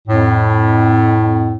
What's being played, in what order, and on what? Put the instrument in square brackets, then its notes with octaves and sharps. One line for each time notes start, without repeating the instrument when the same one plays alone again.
[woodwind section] F2 A2